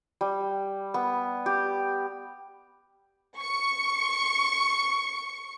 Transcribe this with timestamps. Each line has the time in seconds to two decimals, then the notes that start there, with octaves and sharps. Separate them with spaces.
0.21 G3
0.94 B3
1.46 G4
3.37 C#6 C#7